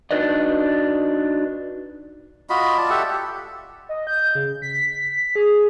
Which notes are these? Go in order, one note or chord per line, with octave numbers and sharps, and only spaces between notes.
D4 D#4 F#4 B4 D5 D#5
F4 F#4 D#5 B5
F4 D5 A5
G4 A4 E5 F#5
G4
D#5
G6
C#3
B6
G#4